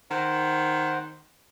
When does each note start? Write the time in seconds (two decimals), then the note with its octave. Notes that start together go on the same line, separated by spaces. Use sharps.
0.11 D#3 C5 F#5